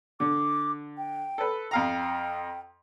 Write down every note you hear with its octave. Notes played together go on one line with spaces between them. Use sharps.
D3 D6
G5
A4 B4
F2 F5 G5 A#5